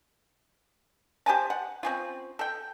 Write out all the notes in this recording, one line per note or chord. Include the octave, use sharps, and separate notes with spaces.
G4 C5 G#5 A5
F#5
C4 C#4 F4
A4 G5